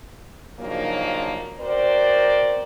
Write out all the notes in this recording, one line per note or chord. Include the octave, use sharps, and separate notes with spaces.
C#3 F3 F#3 A#3 D4 D#4
C4 F#4 A#4 C5 D5